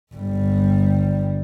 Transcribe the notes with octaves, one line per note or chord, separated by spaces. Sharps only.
G1 G3